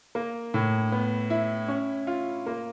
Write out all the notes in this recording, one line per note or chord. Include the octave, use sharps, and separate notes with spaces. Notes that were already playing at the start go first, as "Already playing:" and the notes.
A#3
A2
B3
E4
C#4
F4
A#3